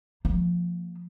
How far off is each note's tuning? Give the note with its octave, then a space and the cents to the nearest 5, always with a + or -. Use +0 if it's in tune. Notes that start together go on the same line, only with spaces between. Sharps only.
F3 +0 A#3 -35